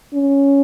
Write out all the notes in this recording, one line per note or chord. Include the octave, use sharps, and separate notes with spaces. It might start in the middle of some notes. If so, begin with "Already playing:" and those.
C#4